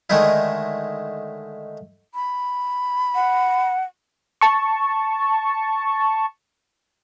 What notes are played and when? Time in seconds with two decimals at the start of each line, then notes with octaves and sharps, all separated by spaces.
0.10 D3 D#3 G#3 A3 D#4 E4
2.14 B5
3.15 F#5
4.41 A5 C#6